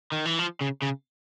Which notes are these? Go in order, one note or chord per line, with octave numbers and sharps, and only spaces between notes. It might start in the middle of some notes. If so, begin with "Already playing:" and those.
D#3
E3
F3
C#3
C#3